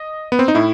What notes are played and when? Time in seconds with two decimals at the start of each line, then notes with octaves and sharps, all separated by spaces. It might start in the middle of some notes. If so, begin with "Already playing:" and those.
Already playing: D#5
0.32 B3
0.39 C4
0.48 D#4
0.55 A2 E4